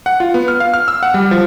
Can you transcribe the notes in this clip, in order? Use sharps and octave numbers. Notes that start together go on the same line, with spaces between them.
F#5
F4
B3
F6
F5
F6
E6
F#5
G3
F3